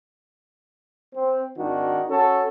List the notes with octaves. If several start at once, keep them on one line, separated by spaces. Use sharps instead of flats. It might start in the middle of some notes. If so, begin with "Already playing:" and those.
C4
G#1 D#3 D4 F#4
C#4 F#4 A4